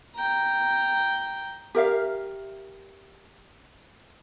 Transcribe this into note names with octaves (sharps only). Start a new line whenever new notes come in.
G5 A#5
G4 A#4 E5 F5